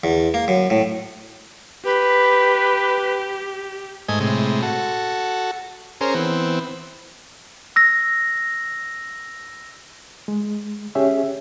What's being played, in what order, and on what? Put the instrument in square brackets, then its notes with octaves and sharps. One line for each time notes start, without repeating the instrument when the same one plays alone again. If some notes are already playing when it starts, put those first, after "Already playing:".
[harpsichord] E2
A#3
F#2
A2
[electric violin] G4 [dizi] B4
[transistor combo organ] G#2 A3 D#5 G#5
A2 C3 G#3
F#4 A4
C#4 G#4 A#4 C5
E3 B3 C4
[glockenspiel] E6 A#6
[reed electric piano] G#3
C#4 G4 G#4 C#5 E5